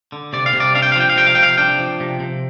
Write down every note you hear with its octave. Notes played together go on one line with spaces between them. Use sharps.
D3
C3 D5
F5
C3
D5
D4 F5
G5
F5
F3
G5
F5
C3 G5
F5
C3 G5
F5
D4 G5
F3
C3
C3